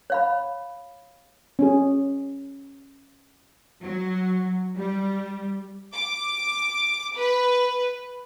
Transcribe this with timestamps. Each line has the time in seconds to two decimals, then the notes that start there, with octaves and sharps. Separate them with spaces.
0.10 C#5 F5 B5
1.59 C#4 G#4
3.82 F#3
4.76 G3
5.94 D6
7.16 B4